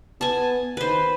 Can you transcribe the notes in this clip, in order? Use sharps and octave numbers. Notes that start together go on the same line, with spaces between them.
B3 G#5 A5
D#3 B4 C5